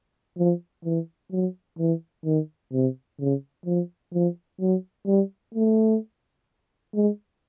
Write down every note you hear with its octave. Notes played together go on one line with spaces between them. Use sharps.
F3
E3
F#3
E3
D#3
C3
C#3
F3
F3
F#3
G3
A3
G#3